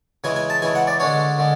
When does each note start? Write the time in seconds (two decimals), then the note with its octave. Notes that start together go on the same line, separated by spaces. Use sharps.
0.24 C#3 E3 G#3 G#5
0.36 G#5
0.50 A5
0.62 C#3 E3 G#3 G#5
0.75 F#5
0.87 D5
1.00 D3 G#3 D4 C#5
1.38 D3 G#3